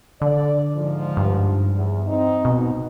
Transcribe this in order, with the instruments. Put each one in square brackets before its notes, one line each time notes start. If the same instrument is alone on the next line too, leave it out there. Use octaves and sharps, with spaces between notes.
[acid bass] D3 [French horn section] D5
[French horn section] G#2 F3
[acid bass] G2
[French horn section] E2
C4 D#4
[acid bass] B2